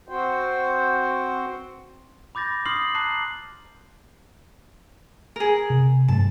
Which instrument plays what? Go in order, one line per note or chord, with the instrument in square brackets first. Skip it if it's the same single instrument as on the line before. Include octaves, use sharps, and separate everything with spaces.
[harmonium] C4 F#4 C5 G5
[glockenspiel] B5 D6 G6 A6 A#6
C6 D6 D#6 F6 C7 F#7
A5 A#5 D6 F#6 C7 F#7
[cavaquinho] G#4 A#4
[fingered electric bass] C3
[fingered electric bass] G2 F#3 A3 [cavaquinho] A5